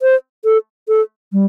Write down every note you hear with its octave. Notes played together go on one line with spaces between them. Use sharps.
C5
A4
A4
G3